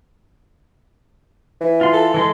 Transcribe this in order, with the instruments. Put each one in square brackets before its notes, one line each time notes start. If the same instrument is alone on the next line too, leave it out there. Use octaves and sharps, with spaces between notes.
[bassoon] E3
[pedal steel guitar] F4 C6
[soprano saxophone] A4
[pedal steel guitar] E3 G#3 C6